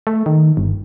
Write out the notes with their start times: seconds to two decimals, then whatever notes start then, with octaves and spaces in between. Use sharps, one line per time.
0.07 A3
0.26 D#3
0.57 G1